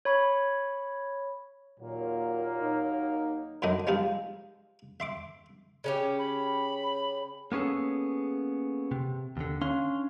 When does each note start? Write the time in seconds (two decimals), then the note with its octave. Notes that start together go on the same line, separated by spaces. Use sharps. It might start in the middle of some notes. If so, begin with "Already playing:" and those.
0.05 C#5 B5 C#6
1.80 D#2 A#2 F#3 A#3
2.62 D#4
3.62 F#2 D3 F#3 D4 D#4 D#5
3.87 F3 G3 G#3 C4 D#4 F4
5.00 E5 C6 D6
5.84 C#3 C#4 G4
6.18 B5
7.52 A#3 B3 C#4 G#4 A4
8.91 C3
9.37 D#2 D3
9.62 C#4 D4 F5 C6